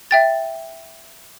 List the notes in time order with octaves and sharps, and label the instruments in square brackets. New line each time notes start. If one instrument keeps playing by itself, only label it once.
[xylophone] E5 G5 A6